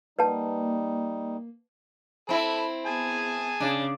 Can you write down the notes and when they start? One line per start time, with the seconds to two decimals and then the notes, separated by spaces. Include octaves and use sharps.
0.19 G3 A#3 D#4 B4 F#5 A5
2.29 C4 E4 A4 B5
2.86 B3 G#4 G#5 A5
3.60 C#3 D4